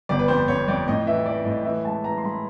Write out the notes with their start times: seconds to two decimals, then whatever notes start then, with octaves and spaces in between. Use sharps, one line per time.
0.09 G1 D5
0.19 B4
0.28 F2 C5
0.48 F2 C#5
0.67 F2 D5
0.87 A2 D#5
1.06 E3 E5
1.26 E3 D5
1.45 A2 D#5
1.65 E3 E5
1.85 G#3 A5
2.04 E3 A#5
2.18 C6
2.24 G#3 B5